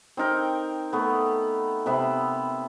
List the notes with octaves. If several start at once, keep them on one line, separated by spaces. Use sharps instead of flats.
C4 D#4 A#4 G5
A3 B3
C3 B3 E5 B5